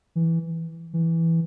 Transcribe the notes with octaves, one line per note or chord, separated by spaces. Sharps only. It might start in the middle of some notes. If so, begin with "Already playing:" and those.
E3
E3